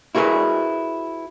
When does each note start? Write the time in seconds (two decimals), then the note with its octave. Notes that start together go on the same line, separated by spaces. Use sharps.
0.15 E4 F#4 G#4 A#4 B4